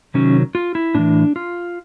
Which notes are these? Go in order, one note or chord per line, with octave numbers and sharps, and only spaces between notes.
C3 D#3 F#3 C#4
F4
E4
A2 E3 D4
F4